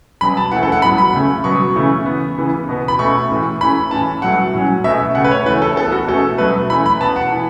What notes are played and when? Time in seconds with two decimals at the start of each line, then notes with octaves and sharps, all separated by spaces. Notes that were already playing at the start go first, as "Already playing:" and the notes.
0.21 B2 F#3 C#4 B5
0.37 A5
0.51 E3 A3 C#4 F#5
0.63 A4
0.72 F#5
0.82 A2 F#3 B3 B5
0.98 B5
1.14 C#3 A3 C#4
1.44 B2 F#3 B3 C#6
1.75 C#3 E3 A3 C#4
2.06 E3 B3
2.38 C#3 E3 B3
2.69 B2 B3
2.88 B5
2.99 B2 A3 C#4 C#6
3.29 A2 E3 A3
3.61 E3 A3 C#4 B5
3.91 A2 E3 C#4 A5
4.22 B2 F#3 A3 F#5
4.53 A2 F#3 C#4
4.84 B2 A3 C#4 E5
5.15 C#3 A3 C#4 F#5
5.24 B4
5.31 C#5
5.46 E3 A3 C#4 B4
5.62 A4
5.77 E3 B3 A4
5.92 F#4
6.07 B2 A3 C#4 A4
6.38 B2 F#3 A3 B4
6.70 E3 A3 C#4 B5
6.86 B5
7.01 B2 B3 A5
7.16 F#5
7.31 E3 B3